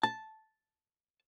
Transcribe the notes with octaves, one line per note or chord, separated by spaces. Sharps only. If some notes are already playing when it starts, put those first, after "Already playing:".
A5